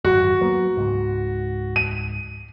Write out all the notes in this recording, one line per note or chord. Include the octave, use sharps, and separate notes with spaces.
D1 G#1 F#2 F#4
F#3 A#3 B3
C#2 G#2
D#7